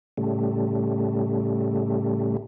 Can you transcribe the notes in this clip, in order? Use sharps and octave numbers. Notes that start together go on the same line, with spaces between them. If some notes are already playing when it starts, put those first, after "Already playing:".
A2 C#3 G3 A3